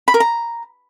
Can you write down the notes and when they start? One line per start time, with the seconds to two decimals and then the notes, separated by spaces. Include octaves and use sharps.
0.08 B5
0.14 A#4
0.20 A#5